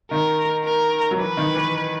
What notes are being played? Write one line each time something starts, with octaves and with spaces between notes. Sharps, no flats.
D#3 A#4
A#4
F#3
E3 B4
D#3
E3